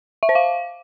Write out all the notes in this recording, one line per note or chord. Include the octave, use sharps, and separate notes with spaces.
E5
C5
F5